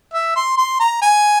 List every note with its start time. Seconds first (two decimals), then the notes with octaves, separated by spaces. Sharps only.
0.14 E5
0.36 C6
0.57 C6
0.80 A#5
1.02 G#5